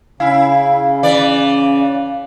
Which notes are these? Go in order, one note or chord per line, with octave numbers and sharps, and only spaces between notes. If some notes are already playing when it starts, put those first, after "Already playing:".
C#3 E4 F5 G#5
E3 D5